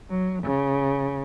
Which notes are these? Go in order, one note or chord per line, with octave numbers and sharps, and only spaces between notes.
F#3
C#3